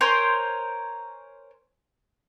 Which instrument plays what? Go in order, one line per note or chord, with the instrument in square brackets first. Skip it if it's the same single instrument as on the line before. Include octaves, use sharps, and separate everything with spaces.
[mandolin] A#4 C5 C#5 G#5